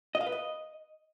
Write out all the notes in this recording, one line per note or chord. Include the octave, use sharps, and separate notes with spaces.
D#5
F5
B4
D#5